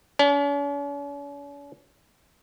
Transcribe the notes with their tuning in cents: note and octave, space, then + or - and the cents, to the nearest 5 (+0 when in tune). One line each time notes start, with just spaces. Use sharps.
C#4 +45